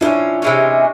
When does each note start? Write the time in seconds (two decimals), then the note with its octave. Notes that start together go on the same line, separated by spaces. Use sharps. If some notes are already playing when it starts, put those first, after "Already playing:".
0.01 F3 A3 D4 E4
0.05 C#4
0.42 C3 E3 G#3 C#4